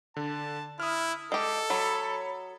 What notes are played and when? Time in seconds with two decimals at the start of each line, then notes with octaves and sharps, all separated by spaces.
0.16 D3 A5
0.80 E4 D#6 F6
1.32 G#3 G4 A4
1.70 F#3 C#5 B5